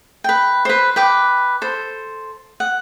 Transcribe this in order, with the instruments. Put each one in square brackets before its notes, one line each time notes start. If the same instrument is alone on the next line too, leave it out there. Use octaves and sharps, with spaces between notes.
[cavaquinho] B4 G5
B4 C5
B4 G5 D6
A4 C5
F#5